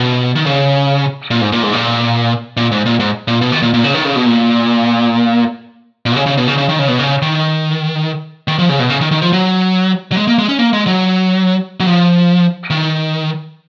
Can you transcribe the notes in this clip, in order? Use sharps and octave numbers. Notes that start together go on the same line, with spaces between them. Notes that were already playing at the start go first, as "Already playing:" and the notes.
Already playing: B2
D#3
C#3
A#2
G#2
A#2
G#2
A#2
A#2
G#2
A#2
G#2
A#2
B2
D#3
A#2
A#2
C#3
D#3
C#3
B2
A#2
A#2
B2
C#3
C#3
B2
C#3
C#3
D#3
C#3
B2
C#3
D#3
D#3
F3
C#3
B2
C#3
D#3
D#3
F3
F#3
F#3
G#3
A#3
G#3
C#4
A#3
G#3
F#3
F#3
F3
D#3